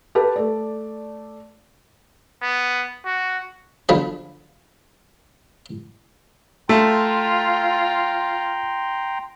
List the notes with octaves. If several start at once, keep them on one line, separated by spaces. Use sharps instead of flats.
G4 A4 B4 A5
A3 D5
B3
F#4
D3 F3 B5
A3 F4 G5 A#5 C6